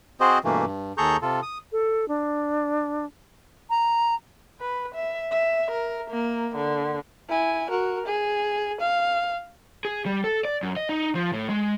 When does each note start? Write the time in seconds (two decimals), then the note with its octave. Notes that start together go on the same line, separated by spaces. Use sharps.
0.20 C4 F#4 G#4 C5 D#5
0.44 G2 B2 E3 A3 A#3
0.65 G2
0.98 D#2 G#4 A4 A#5 C#6 G6
1.22 C3 F4 A4
1.43 D#6
1.72 A4
2.08 D4
3.70 A#5
4.61 B4
4.95 E5
5.32 E5
5.71 A#4
6.10 A#3
6.56 D3
7.29 E4 G#5
7.70 F#4 A#4
8.06 G#4
8.80 F5
9.85 G#4
10.06 G3
10.24 A4
10.45 D5
10.63 F#2
10.77 D#5
10.89 D#4
11.15 F3
11.33 A2
11.49 G#3